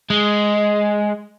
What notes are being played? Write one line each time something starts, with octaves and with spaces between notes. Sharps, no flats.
G#3